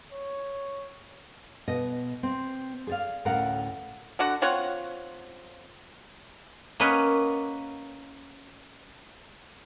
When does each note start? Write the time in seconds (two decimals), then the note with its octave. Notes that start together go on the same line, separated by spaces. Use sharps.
0.12 C#5
1.68 B2 D#5
2.23 C4
2.87 G#4 D5 F5
3.25 D2 A2 C#4 A#4 F5 F#5
4.19 D3 F#4 F#5
4.42 C4 F4 C#5 F#5
6.80 A#3 C#4 A#4 B4 D#5 F#5